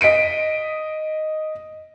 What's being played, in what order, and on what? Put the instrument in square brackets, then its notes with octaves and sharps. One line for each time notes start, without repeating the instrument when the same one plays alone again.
[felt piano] D#5 B6 D7 D#7